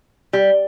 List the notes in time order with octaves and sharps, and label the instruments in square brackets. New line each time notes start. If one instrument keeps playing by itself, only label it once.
[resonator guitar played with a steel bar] G3